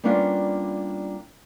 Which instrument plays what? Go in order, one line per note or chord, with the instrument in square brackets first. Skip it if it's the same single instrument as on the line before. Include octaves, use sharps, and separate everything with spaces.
[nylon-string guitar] G3 A#3 B3 C#4 D4 F4